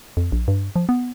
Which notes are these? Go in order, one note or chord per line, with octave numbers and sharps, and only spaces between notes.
F2
A#1
G2
F3
B3